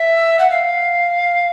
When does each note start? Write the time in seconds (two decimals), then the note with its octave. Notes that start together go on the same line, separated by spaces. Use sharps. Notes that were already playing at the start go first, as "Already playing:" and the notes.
Already playing: E5
0.38 F#5
0.49 F5